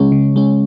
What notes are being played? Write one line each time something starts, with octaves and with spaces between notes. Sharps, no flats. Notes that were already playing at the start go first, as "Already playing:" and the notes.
Already playing: C#3 G#3 C#4
C#3
G#3 C#4